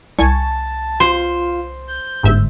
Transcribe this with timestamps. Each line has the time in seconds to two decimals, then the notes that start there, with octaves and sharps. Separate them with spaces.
0.19 C2 G#5 A5 C#6
1.00 F4 C5
1.88 G6
2.23 G1 G#2 E5